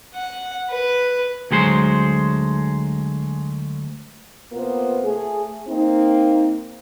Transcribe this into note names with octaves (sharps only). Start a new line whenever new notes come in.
F#5
B4
D2 F#3 G#3 C5
C3 A#3 B3 F4 C5
A3 G#4
A#3 C4 D#4